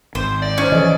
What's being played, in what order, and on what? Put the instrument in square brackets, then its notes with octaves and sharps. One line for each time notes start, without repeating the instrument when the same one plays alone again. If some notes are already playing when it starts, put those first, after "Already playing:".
[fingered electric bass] G#1 [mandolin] C5
[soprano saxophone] D5 [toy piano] F5
[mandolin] C#4 [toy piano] E4 C5
[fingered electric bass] E3 F3 [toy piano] A4 D#5